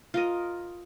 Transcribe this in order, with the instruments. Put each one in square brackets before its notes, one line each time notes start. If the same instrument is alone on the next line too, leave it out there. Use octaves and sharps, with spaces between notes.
[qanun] F4 A#4 D#5